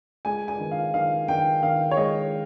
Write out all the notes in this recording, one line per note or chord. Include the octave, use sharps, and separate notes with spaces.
G#3 G#5
G#5
D#3
F5
D#3 F5
D#3 G5
D#3 F5
C#5
G#3 D#5